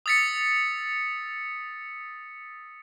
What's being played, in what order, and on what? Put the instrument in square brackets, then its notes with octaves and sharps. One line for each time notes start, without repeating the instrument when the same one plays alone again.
[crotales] D#6 E6 A6 B6 C#7